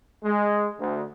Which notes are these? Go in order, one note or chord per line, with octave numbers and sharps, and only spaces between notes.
G#3
D2